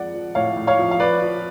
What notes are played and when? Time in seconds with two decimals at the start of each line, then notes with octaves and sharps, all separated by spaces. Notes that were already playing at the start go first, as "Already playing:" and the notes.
Already playing: F3 G#3 D5 F#5
0.14 F3
0.35 A2 C#5 F5
0.57 A2
0.67 C#5 F5
0.79 F3
0.91 F5
1.00 F3 B4 D5
1.22 F3